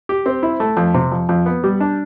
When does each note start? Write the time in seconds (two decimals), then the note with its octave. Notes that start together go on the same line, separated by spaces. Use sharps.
0.09 G4
0.26 C4
0.43 E4
0.60 A3
0.77 F2
0.94 C3
1.12 F2
1.29 F2
1.46 B3
1.64 G3
1.80 D4